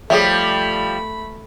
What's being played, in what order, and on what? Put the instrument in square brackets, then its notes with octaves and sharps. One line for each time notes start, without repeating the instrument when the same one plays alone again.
[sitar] F3 G3 [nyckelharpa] A3 B5 [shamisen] G#4 C#5 E5